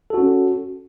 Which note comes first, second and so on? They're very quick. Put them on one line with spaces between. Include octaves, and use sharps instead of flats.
A4 F#4 C#4